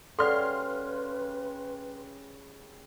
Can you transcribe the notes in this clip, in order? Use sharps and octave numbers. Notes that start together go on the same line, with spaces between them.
C#3 G3 A4 B4 D5 F#5 C6 F6